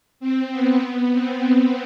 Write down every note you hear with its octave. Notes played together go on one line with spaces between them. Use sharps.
C4
B3
C4